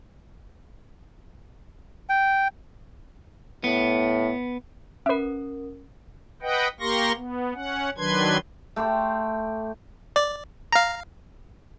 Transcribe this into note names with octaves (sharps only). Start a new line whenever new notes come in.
G5
A2 B3
C#4 A#4 B4 E5
B4 D#5 F#5 G5
A#3 G4 A#4 C6 C#6 A#6
B3
C#4 F#5
D#3 F#3 D4 B4 C6 G#6
A3 G5 C6 D6
D5
F5 A#5